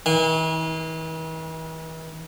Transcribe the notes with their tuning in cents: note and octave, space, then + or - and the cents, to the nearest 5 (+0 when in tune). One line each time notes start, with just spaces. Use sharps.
E3 -45 G#5 -35